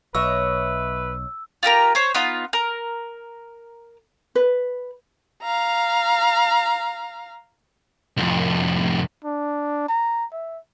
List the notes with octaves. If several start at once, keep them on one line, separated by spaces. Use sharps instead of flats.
B1 B4 C#5 D#5 E5 E6
F4 G4 A#4 A#5
C5 C#5
B3 D#4 F4
A#4
B4
F5 A#5
C2 F2
D4
A#5
E5